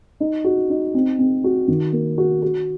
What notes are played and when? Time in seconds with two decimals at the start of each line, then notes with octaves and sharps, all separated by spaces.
0.20 D#4
0.44 F#4
0.70 D#4
0.94 C4
1.19 C4
1.44 F#4
1.68 D#3
1.93 A#3
2.18 F#4
2.42 F#4